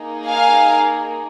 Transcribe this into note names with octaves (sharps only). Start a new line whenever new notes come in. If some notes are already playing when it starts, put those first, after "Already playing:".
Already playing: A#3 D#4 G#4
F5 G#5